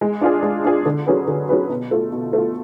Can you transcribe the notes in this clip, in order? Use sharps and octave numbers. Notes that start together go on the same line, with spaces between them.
G#3
D4 F4 G#4
G#3
D4 F4 G#4
D3
F#3 C#4 G#4 B4
D3
F#3 C#4 G#4 B4
B2
A3 F4
B2
A3 F4